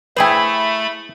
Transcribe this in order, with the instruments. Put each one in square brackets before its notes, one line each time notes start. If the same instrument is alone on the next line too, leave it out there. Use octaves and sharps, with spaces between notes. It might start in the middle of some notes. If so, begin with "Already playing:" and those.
[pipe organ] A3 B5 [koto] E4 G#4 C5 [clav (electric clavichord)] B4 G5